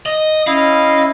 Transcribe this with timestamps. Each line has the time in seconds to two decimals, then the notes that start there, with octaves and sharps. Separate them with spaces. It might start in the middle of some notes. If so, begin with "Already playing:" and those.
0.06 D#5
0.47 C#4 E4 D#5 F5